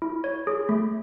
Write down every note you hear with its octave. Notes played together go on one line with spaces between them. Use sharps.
E4
C#5
G#4
A3